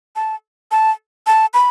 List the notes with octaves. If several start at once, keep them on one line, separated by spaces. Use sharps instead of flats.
A5
A5
A5
B5